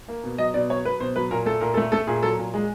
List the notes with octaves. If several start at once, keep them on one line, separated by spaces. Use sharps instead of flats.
A#3
B2
F#3 D#5
B2 D5
F#3 C#5
F#3 B4
B2 C5
F#3 B4
A#2 A#4
A3 A4
A#2 A#4
A4
A3
A3 A4
A#2 G#4
F#3 A4
A#2
G#3